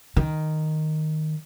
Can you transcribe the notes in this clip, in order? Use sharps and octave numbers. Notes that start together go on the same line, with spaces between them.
D#3